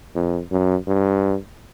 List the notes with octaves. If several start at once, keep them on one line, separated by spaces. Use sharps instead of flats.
F2
F#2
G2